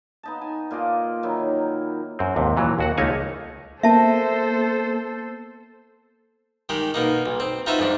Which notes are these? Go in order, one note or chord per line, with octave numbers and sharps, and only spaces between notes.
B3 D#4 A5
G#5
A#2 F4 D5 D#5
D#3 F#3 D#4 E4
F#2 C4
D#2 G#2 C3
A#2 E3 F#3
D#2 F#4 F#5
C#2 A3 A#3 D#4 C#5 G#5
A#3 B3 A4 C5 E5 A5
D#3 G#3 G4
B2 A#3 D#4
B1
C4
D#4 F4 F#4 B4 C5 E5
F2 G#2 D4